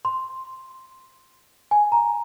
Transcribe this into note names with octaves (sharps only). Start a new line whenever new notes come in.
C6
G#5
A#5